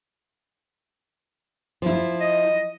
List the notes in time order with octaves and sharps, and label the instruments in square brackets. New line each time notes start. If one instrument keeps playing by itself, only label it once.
[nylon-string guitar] F3 E4
[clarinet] D#5